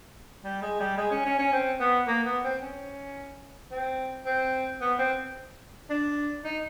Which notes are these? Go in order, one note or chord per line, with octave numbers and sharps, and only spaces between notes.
G3
G#3
G3
G#3
C#4
C#4
C#4
C4
B3
A#3
B3
C4
C#4
C4
C4
B3
C4
D4
D#4